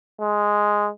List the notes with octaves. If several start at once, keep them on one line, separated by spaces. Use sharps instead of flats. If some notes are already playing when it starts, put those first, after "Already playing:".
G#3